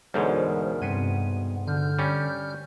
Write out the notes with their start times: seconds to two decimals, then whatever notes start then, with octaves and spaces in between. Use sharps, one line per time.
0.14 D2 G#2 B2 E3 G#3 A#4 C5 C#5
0.82 G2 C3 B3 D#7
1.68 D3 F6 G6
1.99 G3 C#4